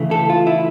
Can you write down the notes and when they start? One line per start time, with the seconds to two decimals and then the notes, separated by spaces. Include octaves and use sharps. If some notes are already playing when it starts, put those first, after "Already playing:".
Already playing: C#3 E3 A3
0.11 A4
0.30 F4
0.47 E4